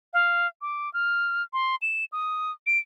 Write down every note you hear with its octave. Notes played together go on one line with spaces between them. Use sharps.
F5
D6
F6
C6
E7
D#6
D7